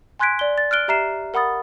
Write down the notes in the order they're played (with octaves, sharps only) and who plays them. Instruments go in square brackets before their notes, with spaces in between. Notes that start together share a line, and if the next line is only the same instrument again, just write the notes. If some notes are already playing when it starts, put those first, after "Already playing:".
[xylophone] G#5 C6 F#6 G#6 B6 D7
D5 G7
A6
F6 F#6 D7 G7
G4 E5 A#5 F6 C7 E7
A#4 F#5 B5 D#6 A6